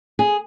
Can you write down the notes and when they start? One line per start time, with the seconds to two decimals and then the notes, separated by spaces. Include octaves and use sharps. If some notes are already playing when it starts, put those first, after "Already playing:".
0.19 G#4